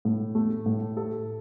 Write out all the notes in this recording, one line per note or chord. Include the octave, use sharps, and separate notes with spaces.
A2
A3
A2
A4